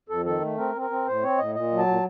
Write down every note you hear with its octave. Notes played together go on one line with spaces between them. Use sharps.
F2 A4
D#3 A4
A3
C4 A#4
C4
A#4
C4
A2 C5
C4 C#5
A2 D#5
A#2 D#5
F#3
A5
A#2